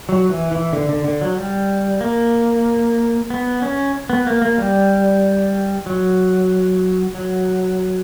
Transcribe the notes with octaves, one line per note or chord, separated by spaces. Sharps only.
F#3
E3
E3
D3
D3
D3
F#3
G3
A#3
B3
C#4
B3
A#3
A#3
G3
F#3
F#3